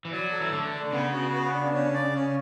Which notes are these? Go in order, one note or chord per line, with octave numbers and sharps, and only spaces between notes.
E3
F#3 D5
A4
E3
D3 A3
D4
C#3 B3
F#4
B3
D4
C#4
D5
C#4